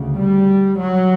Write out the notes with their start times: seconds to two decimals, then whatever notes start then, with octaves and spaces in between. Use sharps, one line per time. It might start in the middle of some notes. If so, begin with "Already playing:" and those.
Already playing: D2 C#3
0.16 G3
0.79 F#3